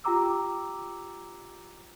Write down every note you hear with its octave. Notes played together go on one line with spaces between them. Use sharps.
F4 G4 G5 A#5 D6 E6